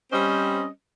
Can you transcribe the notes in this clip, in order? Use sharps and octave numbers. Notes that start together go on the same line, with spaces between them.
G3 C4 C#4 C5 D#5